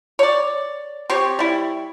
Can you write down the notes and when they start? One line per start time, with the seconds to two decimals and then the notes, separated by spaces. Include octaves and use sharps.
0.19 C#5 D5
1.10 C4 G4 C#5
1.39 G3 E4